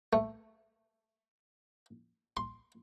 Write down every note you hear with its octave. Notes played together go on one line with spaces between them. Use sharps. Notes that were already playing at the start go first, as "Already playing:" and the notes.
A3
C6